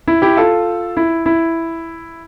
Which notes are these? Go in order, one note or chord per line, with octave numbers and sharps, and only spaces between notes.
E4
E4 G4
F4 A4
E4
E4